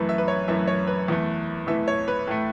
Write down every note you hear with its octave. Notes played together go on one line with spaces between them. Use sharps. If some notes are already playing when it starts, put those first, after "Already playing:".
Already playing: F#2 E3 A3 B4
E5
B4
C#5
F#2 E3 A3 E5
C#5
B4
E2 E3 A3
E2 E3 A3 E5
C#5
B4
A2 A3